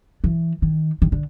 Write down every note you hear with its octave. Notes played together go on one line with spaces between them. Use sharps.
E3
D#3
D#3
D3